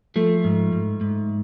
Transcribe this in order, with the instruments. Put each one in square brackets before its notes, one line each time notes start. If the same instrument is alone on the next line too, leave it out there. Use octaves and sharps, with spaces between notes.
[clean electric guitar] F3 A3
G#2
G#2
G#2